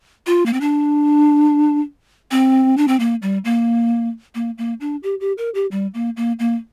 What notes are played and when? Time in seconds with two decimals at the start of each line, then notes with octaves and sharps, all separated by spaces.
0.26 F4
0.46 A#3
0.53 C4
0.61 D4
2.31 C4
2.77 D4
2.88 C4
3.00 A#3
3.22 G3
3.45 A#3
4.35 A#3
4.58 A#3
4.80 D4
5.03 G4
5.21 G4
5.38 A#4
5.55 G4
5.71 G3
5.94 A#3
6.17 A#3
6.39 A#3